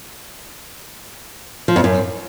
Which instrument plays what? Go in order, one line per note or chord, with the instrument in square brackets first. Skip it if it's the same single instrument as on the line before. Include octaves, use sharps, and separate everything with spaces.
[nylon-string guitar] F3
F2
F#2